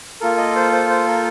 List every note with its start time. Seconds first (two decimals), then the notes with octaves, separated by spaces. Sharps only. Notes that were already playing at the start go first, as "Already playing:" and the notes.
0.21 A#3 F4 A4 A#4
0.38 D#5
0.56 C5
0.72 C5
0.89 C5
1.07 A#4